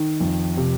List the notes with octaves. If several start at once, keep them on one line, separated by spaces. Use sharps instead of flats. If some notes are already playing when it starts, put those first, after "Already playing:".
Already playing: D#3
F2
C3